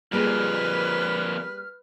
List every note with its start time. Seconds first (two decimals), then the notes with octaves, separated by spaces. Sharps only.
0.12 F2 A#2 G3 A#3 G#4 B4 F6